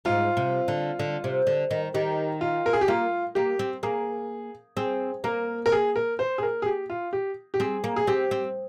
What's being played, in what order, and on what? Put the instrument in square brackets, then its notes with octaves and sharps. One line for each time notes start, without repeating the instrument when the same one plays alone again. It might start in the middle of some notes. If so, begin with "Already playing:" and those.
[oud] G#2 [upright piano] F4
[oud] C3
D3
D3
C3
D3
D#3
[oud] D#3 [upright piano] G4
[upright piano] F4
A#4
G#4
G4
[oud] A#3 [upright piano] F4
[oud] A#3 [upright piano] G4
[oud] C4
[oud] A#3 [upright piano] G#4
[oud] C4 [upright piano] G#4
[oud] A#3 [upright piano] A#4
[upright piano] A#4
G#4
A#4
C5
G#4
A#4
G#4
G4
F4
G4
G4
[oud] C4 [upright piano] G#4
[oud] A#3
[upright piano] G#4
[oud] C4 [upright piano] G4
[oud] C4